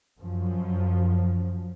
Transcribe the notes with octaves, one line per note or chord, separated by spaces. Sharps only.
F#2 F3